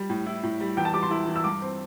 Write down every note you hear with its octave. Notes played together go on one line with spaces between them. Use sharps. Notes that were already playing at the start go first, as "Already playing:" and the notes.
Already playing: G3
A2
E4
A2
G3
E2 G5
A5
G3 D6
C6
E4
E3
E6
G2 D6
C4